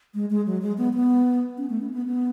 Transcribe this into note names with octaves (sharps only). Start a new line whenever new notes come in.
G#3
G#3
F#3
G#3
B3
B3
C#4
A3
B3
C#4
B3
B3